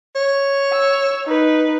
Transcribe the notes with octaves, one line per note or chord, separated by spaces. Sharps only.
C#5
E6
D#4 B4